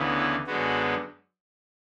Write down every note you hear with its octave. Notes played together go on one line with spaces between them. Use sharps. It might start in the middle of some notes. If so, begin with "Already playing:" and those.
Already playing: D2 C#3 E3 B3
E4
F#2 D3 G#3 B3 F#4